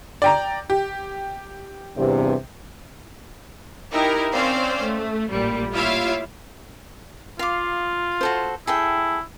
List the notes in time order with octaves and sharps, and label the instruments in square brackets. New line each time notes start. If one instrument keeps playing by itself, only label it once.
[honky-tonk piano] D5 G5 A#5
G4
[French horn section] E2 G2 C3
[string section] D#4 E4 G4 A#4
C4 C#4 C5 D5 F5 G5
A3
A1 A#2 G3
E4 F4 G4 C#5 E5 F5
[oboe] F4 [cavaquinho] F5 D6
[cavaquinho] F#4 A4 C5
[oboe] E4 [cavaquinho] G#4 A4 G5